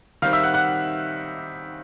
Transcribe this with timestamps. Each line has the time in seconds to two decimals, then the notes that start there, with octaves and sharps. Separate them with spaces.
0.22 D#3 G3 C4 F5 F6
0.33 E5 E6
0.43 F#5 F#6
0.54 F#5 F#6